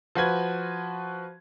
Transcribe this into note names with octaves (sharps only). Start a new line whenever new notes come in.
F3 F#4 B4 G#6